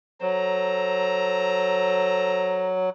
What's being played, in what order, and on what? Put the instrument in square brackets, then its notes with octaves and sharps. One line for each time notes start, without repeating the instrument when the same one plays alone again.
[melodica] F#3 [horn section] A4 C5 A#5